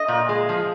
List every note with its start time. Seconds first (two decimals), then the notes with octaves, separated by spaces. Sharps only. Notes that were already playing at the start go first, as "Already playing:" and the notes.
Already playing: D#5
0.08 A#2
0.29 G#3
0.49 F3